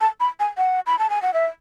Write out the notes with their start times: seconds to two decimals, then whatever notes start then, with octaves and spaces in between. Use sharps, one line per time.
0.01 A5
0.20 B5
0.40 G#5
0.58 F#5
0.87 B5
0.99 A5
1.10 G#5
1.22 F#5
1.34 E5